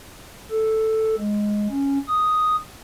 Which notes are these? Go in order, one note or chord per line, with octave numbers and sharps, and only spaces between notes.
A4
G#3
C#4
D#6